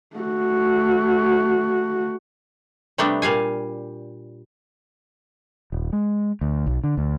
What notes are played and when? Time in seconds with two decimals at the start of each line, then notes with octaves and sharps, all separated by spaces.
0.17 A3 F#4
2.98 C3 G3 A3 B3 D4
3.22 A#2 G3 F5 G#5
5.72 D#1
5.93 G#3
6.41 D2
6.67 B1
6.84 D3
6.97 D2